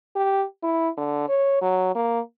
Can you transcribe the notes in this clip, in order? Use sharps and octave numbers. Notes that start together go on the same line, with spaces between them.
G4
E4
D3
C#5
F#3
A#3